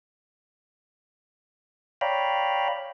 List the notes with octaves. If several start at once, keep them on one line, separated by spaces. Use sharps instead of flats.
C#5 D5 F5 G5 A#5 B5